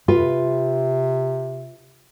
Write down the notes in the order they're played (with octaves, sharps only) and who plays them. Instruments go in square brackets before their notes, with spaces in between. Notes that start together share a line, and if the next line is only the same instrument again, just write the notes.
[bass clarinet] C3 [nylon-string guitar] F4 B4